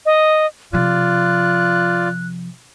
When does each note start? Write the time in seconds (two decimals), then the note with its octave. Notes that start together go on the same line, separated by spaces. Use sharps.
0.06 D#5
0.73 C3 F3 F4 D5 F#6